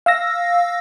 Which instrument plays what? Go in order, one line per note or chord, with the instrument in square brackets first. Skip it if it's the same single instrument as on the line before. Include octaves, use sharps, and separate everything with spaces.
[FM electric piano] F5 E6 A#6